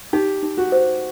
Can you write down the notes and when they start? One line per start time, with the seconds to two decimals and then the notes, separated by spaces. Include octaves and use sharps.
0.13 D#4 G4
0.43 D#4
0.57 F#4
0.72 C5